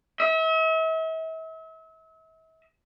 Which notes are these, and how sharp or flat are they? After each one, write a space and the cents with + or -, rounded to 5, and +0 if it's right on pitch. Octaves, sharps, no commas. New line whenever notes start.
E5 -40